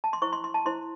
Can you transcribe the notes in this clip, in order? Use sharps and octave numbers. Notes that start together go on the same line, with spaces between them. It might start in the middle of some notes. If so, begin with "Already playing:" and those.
A5
C6
E4 C5 C#6
C6
C6
A5
E4 C5 C6